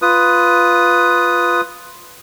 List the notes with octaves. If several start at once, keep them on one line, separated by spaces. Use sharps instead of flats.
F4 B4 D#6